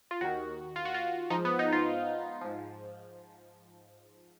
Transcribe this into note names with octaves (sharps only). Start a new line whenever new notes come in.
F4
D#2 D#3 F#4
F4
F#4
F4
G#2 F3 D#4
B3
D#4
F4
G#2 F3